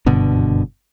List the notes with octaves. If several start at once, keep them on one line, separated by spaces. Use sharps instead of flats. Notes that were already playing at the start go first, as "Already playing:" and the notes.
F#1 G2 B2 D3